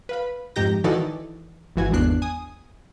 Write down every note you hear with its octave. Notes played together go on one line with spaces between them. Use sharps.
B4 F5 B5
F2 G#2 D#4 G4 G6 A#6
D#3 E3 F#4 A4 D5 D#5
G#1 E3 F#4 G#5
G#1 E2 B3 D4 F#6 C7
G#5 D#6